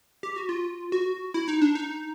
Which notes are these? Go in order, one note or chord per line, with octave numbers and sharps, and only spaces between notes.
G4
F#4
F4
F#4
E4
D#4
D4
D#4